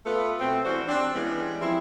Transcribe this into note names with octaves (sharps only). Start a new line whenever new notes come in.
A3 B3 F4 A4 B4
B2 A3 C4
E3 G3 F#4 C5
C4 D4
E3 G3 G#3 B3 C#4
F3 C4 E4